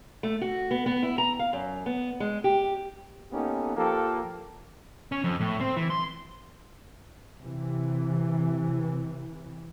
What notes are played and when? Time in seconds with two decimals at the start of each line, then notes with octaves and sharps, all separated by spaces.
0.23 A3
0.41 F#4
0.71 B3
0.86 B3
1.03 E4
1.18 A#5
1.39 F5
1.53 F#2
1.86 B3
2.20 G#3
2.44 G4
3.32 A#3 B3 C#4 D#4 G4 A4
3.77 F3 A#3 F4 G4 A4
5.12 C#4
5.24 F2
5.40 A2
5.60 C4
5.76 E3
5.90 C6
7.38 C3 E3